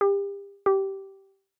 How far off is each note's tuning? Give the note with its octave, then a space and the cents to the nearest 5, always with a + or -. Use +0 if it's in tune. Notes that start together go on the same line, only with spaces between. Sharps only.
G4 +30
G4 -15